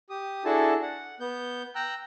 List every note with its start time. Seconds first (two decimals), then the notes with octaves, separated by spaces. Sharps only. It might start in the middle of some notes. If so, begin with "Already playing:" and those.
0.10 G4 D#6
0.45 D4 E4 F#4 G#4 A4 A5
0.82 F#5
1.20 B3 G6
1.75 G5 A#5 E6 F#6